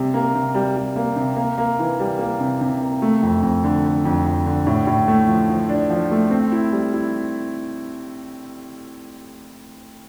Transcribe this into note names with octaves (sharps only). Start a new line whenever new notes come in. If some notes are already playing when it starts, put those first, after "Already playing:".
Already playing: C3 G3
A#3
C3
G3
G3
A#3
C3
A#3
A#3
E3
G3
A#3
C3
C3
A#3
A3
F2
F2
D3
D3
F2
F2
D3
A2
A2
A3
F3
F3
D4
F3
A3
C4
E4
G3
E4